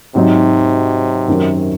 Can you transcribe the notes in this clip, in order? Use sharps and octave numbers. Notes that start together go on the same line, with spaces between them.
G#2 C3 F#3 C4 D#4
F#2 D#3 F#3